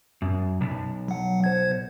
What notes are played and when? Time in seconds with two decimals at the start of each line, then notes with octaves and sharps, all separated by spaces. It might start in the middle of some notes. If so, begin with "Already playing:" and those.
0.22 F#2
0.61 B1
1.08 F#3 F#5
1.44 C5 G#6